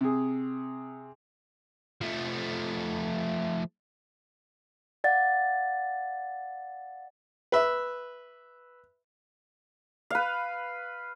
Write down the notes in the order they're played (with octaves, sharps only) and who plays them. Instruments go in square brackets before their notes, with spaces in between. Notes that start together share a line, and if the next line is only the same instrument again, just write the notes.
[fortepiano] C3 G#4
[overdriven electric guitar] F3 A3
[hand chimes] D5 F5 F#5 A6
[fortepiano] B4 E5
[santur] B4 F5